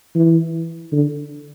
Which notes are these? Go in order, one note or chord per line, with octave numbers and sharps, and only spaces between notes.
E3
D3